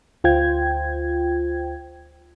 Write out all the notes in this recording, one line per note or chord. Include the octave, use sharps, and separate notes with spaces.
D2 F4 C5 G5 G#6